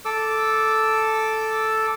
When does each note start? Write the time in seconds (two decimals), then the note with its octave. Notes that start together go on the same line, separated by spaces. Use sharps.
0.05 A4 D6 E6